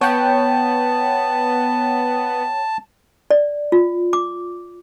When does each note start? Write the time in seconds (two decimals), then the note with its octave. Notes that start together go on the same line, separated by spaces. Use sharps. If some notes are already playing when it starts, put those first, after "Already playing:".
0.01 B3 C#5 G5 A5
3.31 D5
3.72 F4
4.13 D6